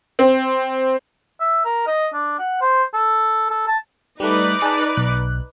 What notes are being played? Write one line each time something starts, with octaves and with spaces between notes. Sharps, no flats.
C4
E5
A#4
D#5
D4
F#5
C5
A4
A4
A5
G3 A3 D#4 B4 D5
G#4 A5
B1 F#6